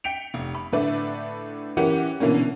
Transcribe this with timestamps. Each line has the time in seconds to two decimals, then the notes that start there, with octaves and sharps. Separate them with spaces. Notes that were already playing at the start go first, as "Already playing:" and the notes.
0.04 G5 B6 C#7 D7 F7
0.34 F1
0.55 B5
0.73 A2 D3 A3 B4 D5 E5
1.77 E3 C#4 G4 A#4 F#5 C#7
2.20 B2 D3 E3 A#3 C#4